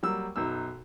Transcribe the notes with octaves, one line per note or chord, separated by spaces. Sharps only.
F#3 G3 A#3 E6
B1 F#2 D#4 E6